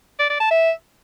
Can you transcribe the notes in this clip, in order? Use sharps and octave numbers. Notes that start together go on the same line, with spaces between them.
D5
D5
A5
E5